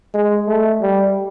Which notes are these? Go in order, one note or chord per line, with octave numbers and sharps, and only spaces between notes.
G#3
A3
G3